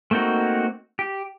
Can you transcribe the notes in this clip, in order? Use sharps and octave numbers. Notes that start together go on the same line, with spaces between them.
A3 A#3 C4 D#4 F#4
G4